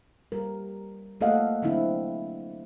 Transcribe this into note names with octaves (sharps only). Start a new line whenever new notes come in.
G3 A#4
A3 A#3 A4 D#5 F5 F#5
D3 F#3 C4 D4 E4